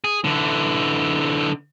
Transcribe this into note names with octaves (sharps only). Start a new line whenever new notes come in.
G#4
D3 E3